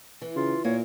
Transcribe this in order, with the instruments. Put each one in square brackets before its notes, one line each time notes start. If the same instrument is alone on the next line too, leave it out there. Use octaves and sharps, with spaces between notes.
[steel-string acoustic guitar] E3
[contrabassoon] C#3 [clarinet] F4
[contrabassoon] A#2 [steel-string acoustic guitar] A#3 [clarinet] C#5